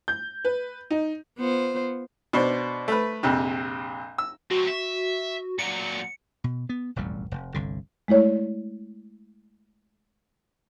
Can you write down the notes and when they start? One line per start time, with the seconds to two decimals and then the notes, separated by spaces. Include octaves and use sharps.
0.08 G6
0.45 B4
0.90 D#4
1.38 B3 F4 C5
2.33 B2 D4 C5
2.88 A3 B4
3.23 A#1 F2 C3
4.18 E6
4.51 F#3 C4 F#4
4.67 E5
5.59 A#2 F#3 C#7
6.44 B2
6.69 B3
6.96 E1 A1 F2 G3
7.31 F1
7.54 G1 C2 D3
8.08 G#3 A3 E4 C#5 D5